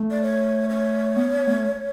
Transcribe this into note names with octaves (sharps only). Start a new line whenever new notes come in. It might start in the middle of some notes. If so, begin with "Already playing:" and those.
Already playing: A3
D5
C#5
C#5
B3
A3